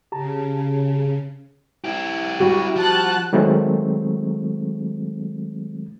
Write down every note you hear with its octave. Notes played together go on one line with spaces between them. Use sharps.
C#3 G4 A5 A#5
E4 G4
G3 F#4
F3 F#5 A5 F#6
D#3 F#3 G#3 A3 C4